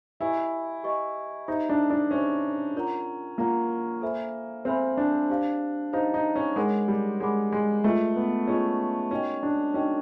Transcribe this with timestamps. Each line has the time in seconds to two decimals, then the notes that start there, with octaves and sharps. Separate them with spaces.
0.20 E4 G4 B4 D#5 G#5 C#6
0.84 G4 B4 D#5 G#5 C#6
1.48 D#4 G4 C5 E5
1.69 D4
1.90 D4
2.11 C#4 G4 C5 E5
2.75 F4 A#4 D5 F#5 A#5
3.38 A#3 F4 A#4 D5 F#5 A#5
4.02 A4 C5 E5 G#5 B5
4.65 C4 A4 C5 E5 G#5 B5
4.97 D4
5.30 G4 C5 F5
5.93 D#4 G4 C5 F5
6.14 D#4
6.35 C#4
6.56 G#3 A#4 C#5 F#5 B5 D6
6.88 G3
7.20 G#3 A#4 C#5 F#5 B5 D6
7.52 G#3
7.84 A3 F4 G#4 B4 D#5
8.16 B3
8.47 C#4 F4 G#4 B4 D#5
9.11 C#4 D#4 F#4 A#4 D#5 G5
9.43 D4
9.74 C#4 D#4 F#4 A#4 D#5 G5